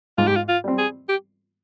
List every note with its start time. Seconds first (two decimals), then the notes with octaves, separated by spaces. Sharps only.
0.18 G#2 F4
0.27 G4
0.36 F4
0.49 F4
0.64 G3 C4
0.78 G#4
1.09 G4